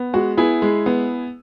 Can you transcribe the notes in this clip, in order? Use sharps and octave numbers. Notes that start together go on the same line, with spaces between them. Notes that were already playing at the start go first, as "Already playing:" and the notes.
Already playing: B3
G#3 F#4
B3 E4 G#4
G#3
B3